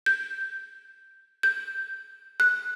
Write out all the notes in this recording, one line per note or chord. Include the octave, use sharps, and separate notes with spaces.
G6
G6
F#6